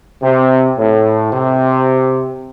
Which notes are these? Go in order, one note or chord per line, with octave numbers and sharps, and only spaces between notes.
C3
A2
C3